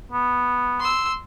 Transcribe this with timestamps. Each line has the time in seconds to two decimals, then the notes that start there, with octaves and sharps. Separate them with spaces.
0.12 B3
0.80 C6 E6